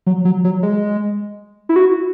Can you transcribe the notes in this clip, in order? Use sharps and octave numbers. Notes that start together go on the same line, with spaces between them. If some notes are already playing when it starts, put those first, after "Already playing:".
F#3
F#3
F#3
G#3
E4
F#4